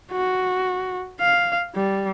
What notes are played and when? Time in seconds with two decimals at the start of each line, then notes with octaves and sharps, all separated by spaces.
0.12 F#4
1.20 F5
1.75 G3